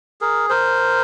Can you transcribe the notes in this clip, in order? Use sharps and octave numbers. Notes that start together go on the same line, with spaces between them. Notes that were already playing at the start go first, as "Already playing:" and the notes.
G#4 A#4
A#4 C5